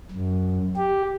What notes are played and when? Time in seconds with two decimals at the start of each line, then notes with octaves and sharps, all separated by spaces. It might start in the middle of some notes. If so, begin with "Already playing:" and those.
0.11 F#2
0.76 G4